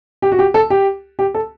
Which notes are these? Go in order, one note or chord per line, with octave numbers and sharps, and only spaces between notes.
G4
F#4
G4
A4
G4
G4
A4